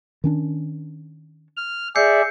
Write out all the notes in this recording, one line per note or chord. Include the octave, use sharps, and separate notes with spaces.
D#3 C#4 D4
F6
G#4 D5 E5 G6 C7 C#7